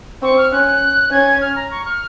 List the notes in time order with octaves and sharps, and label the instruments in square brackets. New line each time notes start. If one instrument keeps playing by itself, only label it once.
[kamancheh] C4 [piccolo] C#6
[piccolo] F6
[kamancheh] C#4 [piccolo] F#6
[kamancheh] C#4 [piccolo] G#6
[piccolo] F6
A#5
C#6
F6